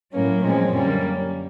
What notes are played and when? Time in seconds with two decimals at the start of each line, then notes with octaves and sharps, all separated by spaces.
0.13 A2 F#3 A#3 C#4
0.43 A#2 F3 G#3 C4 C#4
0.72 F#2 D3 G3 A#3 C#4